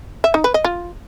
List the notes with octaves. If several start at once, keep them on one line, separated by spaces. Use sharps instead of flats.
E5
D#4
B4
D#5
F4